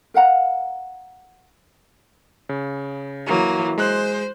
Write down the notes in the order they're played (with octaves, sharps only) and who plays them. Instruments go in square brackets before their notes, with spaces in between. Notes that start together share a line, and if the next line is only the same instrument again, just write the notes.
[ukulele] A#4 F5 F#5 A#5
[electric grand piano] C#3
[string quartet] E3 F#3 A#3
[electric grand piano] G#3 F#6 [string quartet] C5